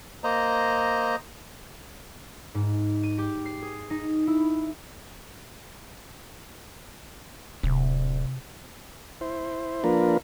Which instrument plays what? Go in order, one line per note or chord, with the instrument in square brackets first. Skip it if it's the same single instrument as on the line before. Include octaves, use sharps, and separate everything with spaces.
[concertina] A#3 C5 D#5 A#5
[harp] G#2
D#7
G4
C7
G#4
D#4
E4
[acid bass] D1 [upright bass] C3
[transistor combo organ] E4 C5
F3 A#3 D4 F4 A#4 B4